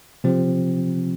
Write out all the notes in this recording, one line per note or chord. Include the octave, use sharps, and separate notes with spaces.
C3 F3 C4